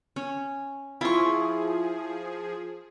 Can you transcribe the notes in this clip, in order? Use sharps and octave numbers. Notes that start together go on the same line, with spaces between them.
C#4
F3 E4 F4 G#4 C#6